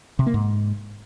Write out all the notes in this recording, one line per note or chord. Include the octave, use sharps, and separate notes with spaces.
C3
A#3
G#2